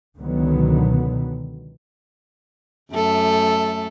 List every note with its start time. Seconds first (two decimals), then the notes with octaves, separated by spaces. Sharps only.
0.18 C#2 B2 D3 D#3 F#3 B3
2.93 F#2 A3 A4